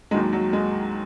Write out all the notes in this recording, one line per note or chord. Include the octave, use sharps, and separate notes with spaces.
D#2 D#3 F#3 G#3
F#3
G#3